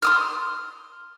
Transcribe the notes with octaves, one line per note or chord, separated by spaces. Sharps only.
C6 D#6 F6